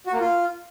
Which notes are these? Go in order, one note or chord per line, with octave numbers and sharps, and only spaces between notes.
F#4
A#3
F4